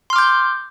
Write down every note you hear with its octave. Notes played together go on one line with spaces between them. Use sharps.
C6 D6 F6 G6